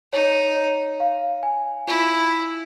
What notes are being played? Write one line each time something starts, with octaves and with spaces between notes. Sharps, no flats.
D#4 C#5
C#5
F5
G#5
E4 F4